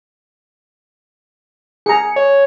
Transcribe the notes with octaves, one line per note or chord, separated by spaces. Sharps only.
G#4 A#5 C#7
C#5